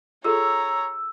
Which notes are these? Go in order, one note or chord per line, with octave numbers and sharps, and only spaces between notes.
F4 G#4 A4 C#5 A#5 E6